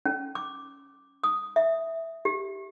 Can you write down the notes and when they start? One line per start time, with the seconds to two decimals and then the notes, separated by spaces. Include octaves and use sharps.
0.05 C#4
0.35 D6
1.24 D#6
1.56 E5
2.25 G4